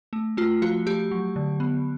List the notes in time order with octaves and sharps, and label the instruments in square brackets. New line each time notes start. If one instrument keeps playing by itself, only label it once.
[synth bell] A3
A3 F4
F3 F#4
A3 G4
F#3
D3
B3